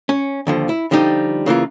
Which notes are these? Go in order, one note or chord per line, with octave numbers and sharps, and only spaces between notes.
C#4
D#2 D3 F3
E4
D3 F3 G3 D#4 G4
C#3 E3 A#3 F4